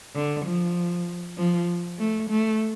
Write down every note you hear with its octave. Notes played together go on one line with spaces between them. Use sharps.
D3
F3
F3
A3
A3